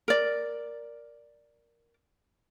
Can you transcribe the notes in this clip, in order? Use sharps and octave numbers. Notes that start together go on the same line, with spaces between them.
A#4 D5